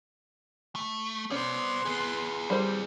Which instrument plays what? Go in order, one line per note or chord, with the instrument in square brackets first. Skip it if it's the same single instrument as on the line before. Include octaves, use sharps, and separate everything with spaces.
[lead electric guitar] A3
[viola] B3 C6 [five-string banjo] C#4 [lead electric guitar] C5 D5
[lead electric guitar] G#4 B4
[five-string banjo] G3 C5